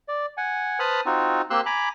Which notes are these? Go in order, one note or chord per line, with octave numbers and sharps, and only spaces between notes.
D5
F#5 G#5
B4 C5 A5 B5 D#6 F6
C4 D#4 F4 F#4
A#3 C4 G4 C6 E6 F#6
G#5 A#5 B5 D6